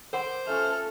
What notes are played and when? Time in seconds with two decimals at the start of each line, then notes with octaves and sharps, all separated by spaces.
0.13 A#4 C5 F#5 C6 D6
0.47 A3 C#4 F4 A4 F6